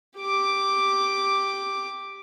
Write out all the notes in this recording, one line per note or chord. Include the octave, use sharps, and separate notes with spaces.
G4 D6